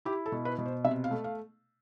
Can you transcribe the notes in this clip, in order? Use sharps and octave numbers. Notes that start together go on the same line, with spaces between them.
E4 G4
A4
B2
B4
B2
C5
C3 E5
F5
A3
F5